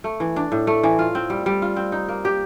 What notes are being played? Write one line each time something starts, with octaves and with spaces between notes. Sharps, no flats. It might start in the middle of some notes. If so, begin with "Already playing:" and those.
A3
E3
D4
A2
A3
E3
F4
C4
G3
G3
F4
C4
D#4
A#3
G4